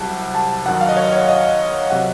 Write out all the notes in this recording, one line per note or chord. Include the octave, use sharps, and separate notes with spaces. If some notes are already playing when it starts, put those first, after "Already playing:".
Already playing: C2 C3 F#3 F#5 A5
A5
F#2 D#3 F#3 F#5
F5
D#5
C#5
C#5
D#5
C3 F#3 F#5